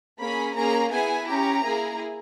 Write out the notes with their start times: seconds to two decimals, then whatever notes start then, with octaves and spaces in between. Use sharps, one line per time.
0.18 A#3 C#4 G#4 B5
0.55 A#3 C#4 G#4 A#5
0.91 B3 E4 G#4 G#5
1.26 C#4 G4 A#5
1.63 A#3 E4 G#4